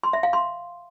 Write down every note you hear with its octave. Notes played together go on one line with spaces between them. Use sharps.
C6
E5
F5
C6